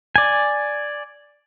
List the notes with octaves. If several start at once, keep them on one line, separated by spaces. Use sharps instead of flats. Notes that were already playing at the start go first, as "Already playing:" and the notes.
D5 G#5